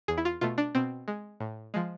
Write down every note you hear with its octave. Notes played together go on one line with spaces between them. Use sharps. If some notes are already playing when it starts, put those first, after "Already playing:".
E2 G#4
E4
F4
B2 A3 F4
D4
B2 C4
G#3
A2
F3 G#3